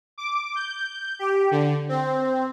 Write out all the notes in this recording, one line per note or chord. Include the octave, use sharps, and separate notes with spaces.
D6
G6
G4
D3
C4